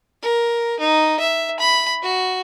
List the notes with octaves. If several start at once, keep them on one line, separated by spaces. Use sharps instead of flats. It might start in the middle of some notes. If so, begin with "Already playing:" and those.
A#4
D#4
E5
B5
F#4